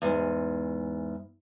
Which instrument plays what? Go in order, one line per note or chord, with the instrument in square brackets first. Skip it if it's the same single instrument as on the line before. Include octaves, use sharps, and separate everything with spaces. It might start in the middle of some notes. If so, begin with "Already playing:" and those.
[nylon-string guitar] E2 G#2